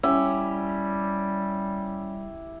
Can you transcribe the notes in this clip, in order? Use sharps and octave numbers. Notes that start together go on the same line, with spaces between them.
G3 C#4 E4 G4 F#5